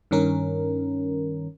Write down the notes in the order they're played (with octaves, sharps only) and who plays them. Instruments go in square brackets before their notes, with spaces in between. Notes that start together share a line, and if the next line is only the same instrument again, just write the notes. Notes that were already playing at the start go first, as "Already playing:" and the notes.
[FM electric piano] G2 D#3 C#4 A#4